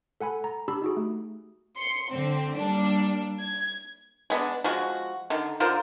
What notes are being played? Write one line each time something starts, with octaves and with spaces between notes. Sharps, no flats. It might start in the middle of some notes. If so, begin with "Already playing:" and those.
A4 F#5 G#5 B5
A#5
D4 G4 B5 E6
D#4 F#4 G#4
A3
C6 C#7
D3 C4
G3 A#3 D4
G#6
G#3 B3 D4
F3 G#3 F#4
D3 D#3
D3 F4 A#4 C5